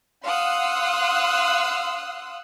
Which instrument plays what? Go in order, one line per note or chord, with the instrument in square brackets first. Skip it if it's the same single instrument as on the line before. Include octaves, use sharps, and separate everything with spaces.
[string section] F5 F#5 C6 D#6 E6 F#6